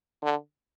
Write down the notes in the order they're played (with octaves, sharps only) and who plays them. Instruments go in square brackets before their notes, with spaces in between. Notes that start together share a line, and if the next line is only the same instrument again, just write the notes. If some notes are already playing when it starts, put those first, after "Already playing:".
[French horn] D3